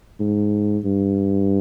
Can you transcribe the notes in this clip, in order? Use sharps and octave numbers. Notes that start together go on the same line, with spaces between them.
G#2
G2